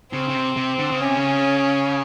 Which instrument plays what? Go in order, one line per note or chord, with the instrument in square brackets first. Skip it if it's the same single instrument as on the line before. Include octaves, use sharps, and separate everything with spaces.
[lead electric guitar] C#3 [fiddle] C4
[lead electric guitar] C#3
C3
C3
D3
C#3
[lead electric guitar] C3 [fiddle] C#4
[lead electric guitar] C#3